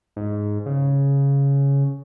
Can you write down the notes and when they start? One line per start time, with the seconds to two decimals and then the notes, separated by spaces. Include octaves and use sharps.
0.16 G#2
0.66 C#3